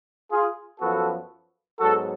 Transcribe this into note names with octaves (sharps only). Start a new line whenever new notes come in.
F4 G#4
F#2 F3 B3 F#4 A4
G#2 F#3 B3 F#4 A4